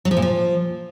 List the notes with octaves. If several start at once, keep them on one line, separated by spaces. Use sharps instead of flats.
F#3
F3
A#2
F3